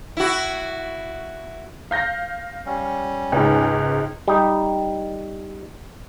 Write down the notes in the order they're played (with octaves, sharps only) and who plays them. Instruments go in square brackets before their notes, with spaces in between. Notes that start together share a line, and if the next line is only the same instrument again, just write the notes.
[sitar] E4 F#4
[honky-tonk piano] F5 G6 A#6
[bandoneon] G3 C#4
[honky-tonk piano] C#2 G#2
[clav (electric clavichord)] G3 D#4